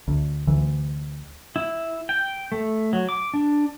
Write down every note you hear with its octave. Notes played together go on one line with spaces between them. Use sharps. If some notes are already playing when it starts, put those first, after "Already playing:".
D2
D2 E3
E4
G5
A3
F#3
D6
D4